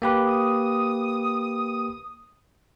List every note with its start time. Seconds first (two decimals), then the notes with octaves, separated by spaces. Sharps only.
0.02 A#3 G4 B4
0.27 D#6